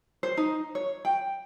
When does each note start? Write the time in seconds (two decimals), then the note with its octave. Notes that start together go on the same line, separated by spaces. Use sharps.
0.23 C5
0.37 D#4
0.75 C#5
1.05 G5